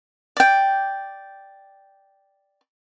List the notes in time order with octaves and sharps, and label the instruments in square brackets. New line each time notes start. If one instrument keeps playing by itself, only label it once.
[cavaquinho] D5 G5